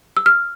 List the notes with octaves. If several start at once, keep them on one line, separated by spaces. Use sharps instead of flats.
E6
F6